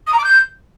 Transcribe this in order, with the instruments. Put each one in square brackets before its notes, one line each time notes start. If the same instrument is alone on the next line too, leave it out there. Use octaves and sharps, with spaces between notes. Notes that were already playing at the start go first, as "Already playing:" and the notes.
[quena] D#6
A#5
D6
G6